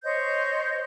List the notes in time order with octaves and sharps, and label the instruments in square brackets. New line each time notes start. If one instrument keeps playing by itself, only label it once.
[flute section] C5 C#5 D#5 G6